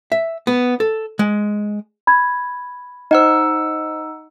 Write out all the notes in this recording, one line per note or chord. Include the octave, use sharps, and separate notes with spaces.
E5
B3
A4
G#3
B5 G#6
D#4 C5 D#5 F#5 E6